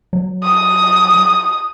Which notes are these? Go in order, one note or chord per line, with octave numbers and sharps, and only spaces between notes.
F#3
D#6